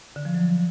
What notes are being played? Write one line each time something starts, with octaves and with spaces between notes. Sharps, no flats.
D3
F3
F#3